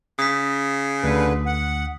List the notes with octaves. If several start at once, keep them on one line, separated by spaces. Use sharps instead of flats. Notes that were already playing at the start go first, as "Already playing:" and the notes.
C#3 D#6 B6
D2 D3 B4
F#5